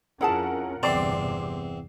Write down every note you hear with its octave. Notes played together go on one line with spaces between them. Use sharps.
F2 C#4 E4 F4 G#4 A#4 F#5 A5
G1 E2 C3 C4 D5 C6 D6 C7